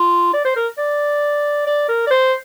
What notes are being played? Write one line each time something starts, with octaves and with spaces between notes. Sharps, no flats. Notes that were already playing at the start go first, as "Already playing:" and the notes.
Already playing: F4
D5
C5
A#4
D5
D5
A#4
D5
C5